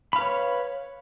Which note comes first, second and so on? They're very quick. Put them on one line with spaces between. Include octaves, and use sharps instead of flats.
B5 F5 B4 C#5